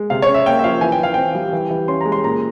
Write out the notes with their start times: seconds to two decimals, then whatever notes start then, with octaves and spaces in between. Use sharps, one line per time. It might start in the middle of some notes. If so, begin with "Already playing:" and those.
Already playing: G#3
0.10 C3 F5
0.22 C#5
0.29 C#4
0.34 E5
0.46 A#3 G5
0.59 E5
0.64 F3 F5
0.81 E3 G#5
0.92 G5
1.00 E3 F5
1.14 C4 G5
1.35 G3
1.53 E3
1.71 E3
1.88 C#4 C6
2.01 G#3 A#5
2.12 C6
2.24 A#2 A#5